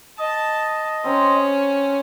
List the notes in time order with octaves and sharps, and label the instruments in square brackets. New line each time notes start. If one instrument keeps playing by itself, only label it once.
[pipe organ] D#5 [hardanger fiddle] A5
[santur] C4 A#5 C6 [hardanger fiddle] C#4